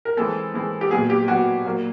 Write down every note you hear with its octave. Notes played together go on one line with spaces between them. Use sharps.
A#4
E3 G#3 C4 A4
E3 G#3 C4
G4
A#2 F#3 B3 G#4
G4
A#2 F#3 B3 F#4
A#2 F#3 A#3